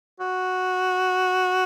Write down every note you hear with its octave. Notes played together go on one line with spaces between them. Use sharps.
F#4